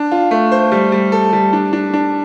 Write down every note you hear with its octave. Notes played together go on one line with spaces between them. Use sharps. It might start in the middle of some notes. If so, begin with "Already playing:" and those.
Already playing: D4
F4
A3
C5
G3
G3
A4
G3
D4
D4
D4